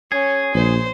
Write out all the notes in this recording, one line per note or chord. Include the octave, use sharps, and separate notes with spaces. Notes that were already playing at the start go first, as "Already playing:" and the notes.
C#4 G#4
A#1 C5